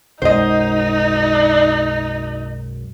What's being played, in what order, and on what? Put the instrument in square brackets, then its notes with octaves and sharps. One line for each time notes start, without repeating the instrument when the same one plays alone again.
[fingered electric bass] B1 F#2 G#3 [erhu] D#4 [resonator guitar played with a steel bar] C5 D#5